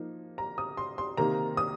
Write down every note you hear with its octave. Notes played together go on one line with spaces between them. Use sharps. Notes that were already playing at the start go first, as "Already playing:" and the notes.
Already playing: F3 A#3 D#4
A#5
D#6
C6
C6
C3 D#3 A#3 A#5
D#6